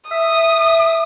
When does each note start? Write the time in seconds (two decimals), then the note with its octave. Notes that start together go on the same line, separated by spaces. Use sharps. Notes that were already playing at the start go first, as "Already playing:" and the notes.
0.11 E5 D#6